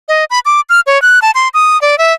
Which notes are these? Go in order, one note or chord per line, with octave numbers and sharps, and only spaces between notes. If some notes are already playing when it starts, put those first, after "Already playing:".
D#5
B5
D6
F6
C#5
F#6
A5
C6
D#6
D5
E5